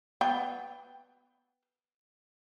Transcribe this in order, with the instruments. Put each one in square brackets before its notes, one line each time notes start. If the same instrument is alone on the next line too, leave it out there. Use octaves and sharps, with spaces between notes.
[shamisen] B3 G5